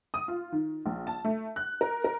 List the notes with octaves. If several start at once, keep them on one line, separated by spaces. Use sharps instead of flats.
D#6
F4
D#3
A#1
A5
A3
F#6
A#4
A#4